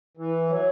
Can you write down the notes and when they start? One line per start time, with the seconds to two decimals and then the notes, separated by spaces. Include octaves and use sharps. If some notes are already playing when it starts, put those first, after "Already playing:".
0.17 E3
0.49 F#3